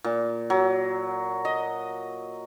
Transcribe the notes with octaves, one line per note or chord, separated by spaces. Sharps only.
A#2
F#3
D#5